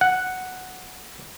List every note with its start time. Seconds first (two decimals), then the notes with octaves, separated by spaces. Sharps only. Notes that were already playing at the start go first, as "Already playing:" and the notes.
0.01 F#5